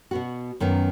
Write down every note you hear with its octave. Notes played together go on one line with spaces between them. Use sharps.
B2 B3 F#4
F#2 D#3 B3